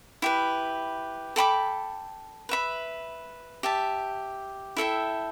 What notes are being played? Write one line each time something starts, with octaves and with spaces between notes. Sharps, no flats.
E4 G4 B4
A4 G5 B5 D6
B4 E5 B5
G4 E5 A5
E4 A4 E5 G5